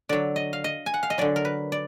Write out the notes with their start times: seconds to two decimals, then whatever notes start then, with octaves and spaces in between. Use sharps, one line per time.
0.09 D3 F#3 D5
0.36 D#5
0.53 F5
0.64 D#5
0.86 G#5
0.94 F#5
1.03 F5
1.10 D#5
1.18 D3 F#3 D5
1.36 A#4
1.45 B4
1.72 D5